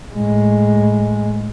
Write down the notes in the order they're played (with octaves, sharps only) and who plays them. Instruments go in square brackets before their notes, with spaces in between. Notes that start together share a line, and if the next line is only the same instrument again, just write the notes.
[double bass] A2 G#3